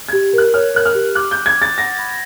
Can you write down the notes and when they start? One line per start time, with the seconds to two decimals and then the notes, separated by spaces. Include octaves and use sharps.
0.09 G#6
0.13 G4
0.33 A#4 F#6
0.54 C#5 F6
0.75 A#4 F#6
0.85 F6
0.95 G4
1.15 D6 F#6
1.31 G6
1.37 D6
1.46 G#6
1.57 D6 A6
1.77 F#5 A#6
1.98 B5